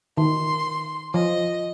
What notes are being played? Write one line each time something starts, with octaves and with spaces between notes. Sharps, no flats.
D#3 C6
F3 D#5